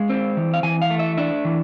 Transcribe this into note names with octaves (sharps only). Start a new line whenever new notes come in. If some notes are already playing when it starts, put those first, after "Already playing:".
Already playing: G#3 F5
C4
E3
F5
E3 G#5
F5
A3
E5
D4 E5
E3